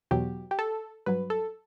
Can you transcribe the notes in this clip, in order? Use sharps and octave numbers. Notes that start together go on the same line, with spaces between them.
E2 B2 F#3 G4
G4
A4
G2 F#3 B4
A4